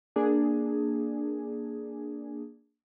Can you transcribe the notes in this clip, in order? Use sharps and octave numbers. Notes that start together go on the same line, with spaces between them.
A#3 D4 G#4